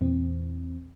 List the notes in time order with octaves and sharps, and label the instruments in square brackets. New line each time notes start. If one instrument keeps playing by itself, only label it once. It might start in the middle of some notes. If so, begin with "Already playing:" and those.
[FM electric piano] E2 A#2 E3 C4